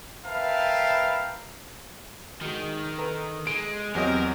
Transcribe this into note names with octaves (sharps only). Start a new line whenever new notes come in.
A#4 B4 E5 F5 G5 A5
D#3 G#3 F#4
A4 B4 A#5
G#3 D7
E2 F#3 C4 G4 A#4 D#5